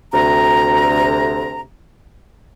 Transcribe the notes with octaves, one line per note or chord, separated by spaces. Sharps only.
D2 C3 A#5